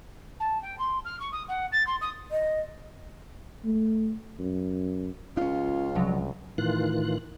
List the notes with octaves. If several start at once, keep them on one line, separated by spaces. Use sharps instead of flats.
A5
G5
C6
F6
C#6
D#6
F#5
A6
C6
D#6
D#5
A3
F#2
C#2 C#4 D4 F4
C2 D3 F3 F#3
A2 D#3 E3 F4 F#6